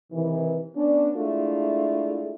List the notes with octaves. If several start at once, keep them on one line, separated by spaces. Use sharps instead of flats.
C3 D#3 E3
B3 C#4 D4
G#3 A3 D4 E4 F4